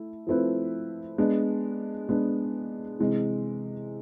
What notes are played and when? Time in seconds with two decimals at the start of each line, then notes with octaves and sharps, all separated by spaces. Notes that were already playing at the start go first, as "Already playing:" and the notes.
Already playing: A3 E4
0.27 F3 A3 C4 E4 B4
1.18 G#3 B3 D4
2.09 G#3 B3 D4
2.99 C3 E3 G#3